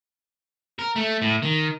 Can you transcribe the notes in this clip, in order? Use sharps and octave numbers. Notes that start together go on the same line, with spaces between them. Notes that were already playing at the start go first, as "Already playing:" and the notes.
A#4
A3
A2
D#3